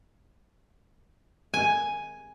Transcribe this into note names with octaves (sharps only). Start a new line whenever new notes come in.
G#5